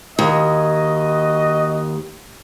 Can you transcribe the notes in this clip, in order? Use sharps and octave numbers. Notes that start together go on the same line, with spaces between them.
D#2 F#4 D#5